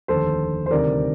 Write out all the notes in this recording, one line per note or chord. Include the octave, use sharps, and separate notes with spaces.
F1 D#2 D3 A4 C5
C5
D2 C3 D#3 G3 C4 A#4 D5